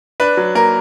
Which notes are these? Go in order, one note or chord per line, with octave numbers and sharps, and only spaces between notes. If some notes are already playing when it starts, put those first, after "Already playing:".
D4 B4
F#3
A#3 A#4